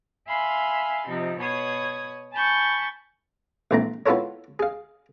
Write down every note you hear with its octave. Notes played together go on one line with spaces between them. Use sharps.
E5 F5 G#5 B5 C6
C3 F3 D#4
B2 C#5 B5 D#6 G#6
G#5 A5 B5 C#6 G6 A6
A#1 E3 A3 C4 A#5
B3 E4 F4 A4 A#4 C#5
G#4 F5